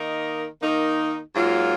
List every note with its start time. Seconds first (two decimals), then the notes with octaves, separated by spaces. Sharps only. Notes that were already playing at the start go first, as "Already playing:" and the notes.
Already playing: D#3 A#3 D#4 A#4 D#5
0.60 D#3 A#3 D#4 A#4 D#5
1.34 G#2 F#3 A#3 F4